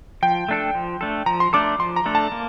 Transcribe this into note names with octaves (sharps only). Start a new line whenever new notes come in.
F3 G5
A3 D4 A4
F3
A3 D4 A4
F3 A#5
C6
A3 D4 A4 D6
F3 C6
A#5
A3 D4 A4
A5
A#3